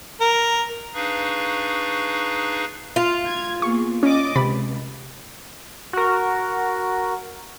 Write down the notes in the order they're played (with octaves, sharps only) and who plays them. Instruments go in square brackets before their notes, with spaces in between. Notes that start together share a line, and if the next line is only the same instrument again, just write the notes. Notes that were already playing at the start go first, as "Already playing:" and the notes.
[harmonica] A#4
[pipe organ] D4 D#4 G#4 B4 F5 C#6
[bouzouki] F4
[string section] G#6
[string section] A#3 B3 G#4 [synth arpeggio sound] C#6
[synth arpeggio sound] C#4 [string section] D5 D#5 D6
[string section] C#2 [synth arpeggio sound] C3 B5 A6
[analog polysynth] F#4 A#4